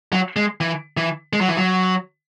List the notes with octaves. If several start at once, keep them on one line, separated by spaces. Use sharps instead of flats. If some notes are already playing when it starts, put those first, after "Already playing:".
F#3
G#3
E3
E3
G#3
F#3
E3
F#3